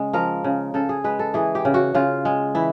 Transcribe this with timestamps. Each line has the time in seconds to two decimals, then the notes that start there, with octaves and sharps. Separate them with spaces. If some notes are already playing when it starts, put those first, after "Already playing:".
Already playing: C#3 G#3
0.13 F3 A#4
0.44 C#3
0.74 C#3 A4
0.89 G#4
1.04 G#3 B4
1.19 A4
1.34 E3 G#4
1.55 G4
1.65 C#3
1.74 F#4
1.95 C#3 F4
2.25 G#3
2.55 E3 E4